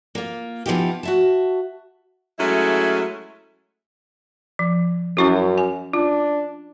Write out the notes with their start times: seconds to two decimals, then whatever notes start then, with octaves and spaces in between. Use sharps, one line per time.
0.15 A#3 F4
0.66 E3 F3 B3 C#4 D#4 G4
1.03 F#4 E5 A5
2.39 F#3 G#3 A3 C#4 E4
4.59 F3
5.17 F#2 C#4 E4 F#4
5.58 G#5
5.93 D4 F4